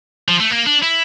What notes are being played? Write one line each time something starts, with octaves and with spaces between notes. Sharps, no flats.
F3
A3
A#3
D4
E4